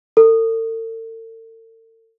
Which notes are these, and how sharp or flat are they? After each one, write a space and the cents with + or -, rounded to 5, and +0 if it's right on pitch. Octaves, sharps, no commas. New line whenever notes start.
A4 +45